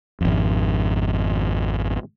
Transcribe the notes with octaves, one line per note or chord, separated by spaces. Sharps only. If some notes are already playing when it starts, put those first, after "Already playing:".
G#1 F2